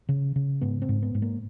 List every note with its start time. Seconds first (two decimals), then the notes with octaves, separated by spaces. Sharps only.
0.09 C#3
0.36 C#3
0.61 G#2 B3
0.82 C4
0.89 G#2
1.02 B3
1.15 G#2
1.22 A#3